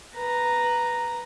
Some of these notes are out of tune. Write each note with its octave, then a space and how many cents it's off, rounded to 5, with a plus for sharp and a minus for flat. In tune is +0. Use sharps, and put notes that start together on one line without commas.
B4 +0 A#5 +0